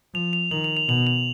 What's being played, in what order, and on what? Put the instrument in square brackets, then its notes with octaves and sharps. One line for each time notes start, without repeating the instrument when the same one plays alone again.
[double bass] F3 [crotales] F7
[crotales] F7
[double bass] D#3 [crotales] F#7
[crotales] F7
F7
[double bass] B2 [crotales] F#7
[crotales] F7